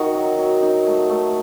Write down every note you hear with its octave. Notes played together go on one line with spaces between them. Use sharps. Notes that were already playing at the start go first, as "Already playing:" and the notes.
Already playing: D#3 D#4 F#4
F#3
F#3
D#4
A3
A3